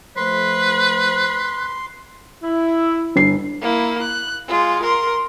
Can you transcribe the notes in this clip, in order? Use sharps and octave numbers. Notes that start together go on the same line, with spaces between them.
F3 A3 B4 C5 C6
E4
G1 C7
A#3 E4
F#6
G#3 F4
A#4 C6